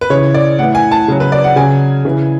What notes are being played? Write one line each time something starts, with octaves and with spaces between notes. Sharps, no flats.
B4
C#3 E3 C#5
D5
A2 E3 F#5
G#5
A5
C#3 F#3
B4
D5
F#5
C#3 F#3 G#5
C#3 E3